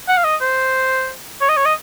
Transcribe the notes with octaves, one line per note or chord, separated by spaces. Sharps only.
F#5
F5
D#5
C5
C#5
D#5
C#5
D#5